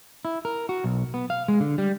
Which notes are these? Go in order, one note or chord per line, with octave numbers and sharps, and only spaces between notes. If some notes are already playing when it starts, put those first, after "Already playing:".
E4
A#4
F#4
B1
B3
F5
G#3
D3
G3